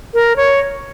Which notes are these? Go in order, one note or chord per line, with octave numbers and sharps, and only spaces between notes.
A#4
C#5